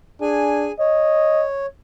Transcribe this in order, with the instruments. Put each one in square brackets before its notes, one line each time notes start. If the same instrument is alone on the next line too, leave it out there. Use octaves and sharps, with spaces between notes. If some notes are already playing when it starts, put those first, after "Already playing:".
[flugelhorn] D4 [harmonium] G#4 G#5
[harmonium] C#5 [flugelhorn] D#5